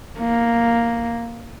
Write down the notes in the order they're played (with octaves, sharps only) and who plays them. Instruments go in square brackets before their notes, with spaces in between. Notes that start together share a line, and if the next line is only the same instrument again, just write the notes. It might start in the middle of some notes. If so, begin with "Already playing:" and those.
[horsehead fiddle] A#3